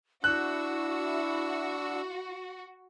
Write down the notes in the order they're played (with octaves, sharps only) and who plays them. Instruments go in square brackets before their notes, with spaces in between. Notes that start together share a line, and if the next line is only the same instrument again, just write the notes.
[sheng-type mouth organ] D4 E6 [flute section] E4 [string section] F#4 [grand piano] F#6